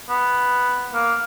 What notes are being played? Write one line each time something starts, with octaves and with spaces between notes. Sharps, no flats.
B3
A#3